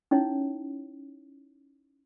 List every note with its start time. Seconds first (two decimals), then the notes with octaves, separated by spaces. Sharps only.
0.11 C#4 D#4 E4 C#5